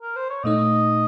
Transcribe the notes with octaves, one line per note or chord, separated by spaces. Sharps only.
A#4
C5
C#5
A#2 A3 D#4 D#5